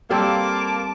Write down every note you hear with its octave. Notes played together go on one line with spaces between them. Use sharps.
G3 A#3 C4 A4 A5 D6